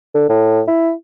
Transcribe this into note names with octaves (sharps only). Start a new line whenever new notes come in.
D3
A2
E4